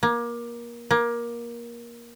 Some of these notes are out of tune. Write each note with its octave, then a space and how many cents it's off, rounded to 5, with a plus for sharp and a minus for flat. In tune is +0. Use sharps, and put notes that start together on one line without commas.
A#3 +25
A#3 +20